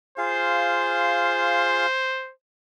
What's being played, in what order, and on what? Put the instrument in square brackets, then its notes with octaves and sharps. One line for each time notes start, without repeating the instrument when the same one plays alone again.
[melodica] F4 G#4 F5 [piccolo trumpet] C5